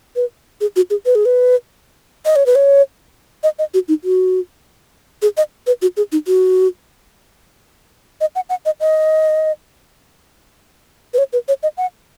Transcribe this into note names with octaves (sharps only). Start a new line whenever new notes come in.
B4
G#4
F#4
G#4
B4
G#4
B4
D#5
C#5
B4
C#5
D#5
D#5
F#4
D#4
F#4
G#4
D#5
B4
F#4
G#4
D#4
F#4
D#5
F#5
F#5
D#5
D#5
B4
C#5
B4
C#5
D#5
F#5